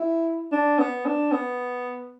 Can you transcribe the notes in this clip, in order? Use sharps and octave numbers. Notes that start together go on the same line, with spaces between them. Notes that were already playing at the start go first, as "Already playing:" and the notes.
Already playing: E4
D4
B3
D4
B3